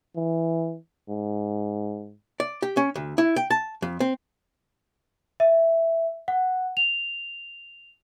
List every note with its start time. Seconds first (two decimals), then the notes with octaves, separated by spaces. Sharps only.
0.16 E3
1.09 G#2
2.40 D5
2.62 G4
2.77 C#4
2.96 D2
3.18 E4
3.36 G5
3.51 A5
3.82 F2
4.00 C4
5.40 E5
6.28 F#5
6.77 F7